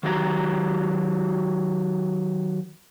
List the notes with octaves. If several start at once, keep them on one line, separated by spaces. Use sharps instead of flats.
D#3 F#3 F#4 G4 D5 A#5